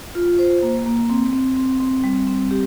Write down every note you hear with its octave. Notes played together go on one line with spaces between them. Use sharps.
F4
C5
A#3
A#3
C4
C4
C4
C4
G3
C4
G4